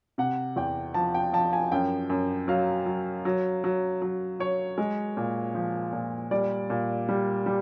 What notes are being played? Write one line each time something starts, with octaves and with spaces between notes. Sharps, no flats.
C3 F#5
E2 G5
F3 A5
G5
F3 A5
G#5
F#2 G5
F#2
F#3 F5
F#3
F#3
F#3
F#3
F#3 C#5
G#3
A#2
F3
A#2
G3 D5
A#2
G3
G3